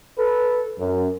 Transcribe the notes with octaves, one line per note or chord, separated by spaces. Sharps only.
A4 B4
F#2